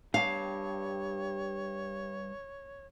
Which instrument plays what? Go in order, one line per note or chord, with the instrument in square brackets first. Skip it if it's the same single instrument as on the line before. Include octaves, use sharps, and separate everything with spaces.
[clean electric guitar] G2 A5 [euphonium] G4 [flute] C#5 [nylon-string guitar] F5